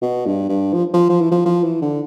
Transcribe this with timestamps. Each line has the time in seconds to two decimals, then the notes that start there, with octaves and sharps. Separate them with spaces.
0.02 B2
0.26 G2
0.49 G2
0.73 F3
0.93 F3
1.09 F3
1.21 E3
1.31 F3
1.45 F3
1.63 E3
1.82 D3